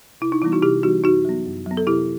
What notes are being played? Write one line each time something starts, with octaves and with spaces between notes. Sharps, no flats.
C3 E4
D#4
E3 G3 B3 E4
D#4 F#4
C3 E4 G4
E3 G3 B3 D#4 F#4
F#2 D#4 F#4
F#3 B3
F#2
F#3 B3
A4
C3 E4 G4